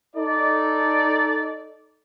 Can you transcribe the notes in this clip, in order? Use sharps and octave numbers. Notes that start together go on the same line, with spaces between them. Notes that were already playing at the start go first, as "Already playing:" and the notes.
D#4 A4 D5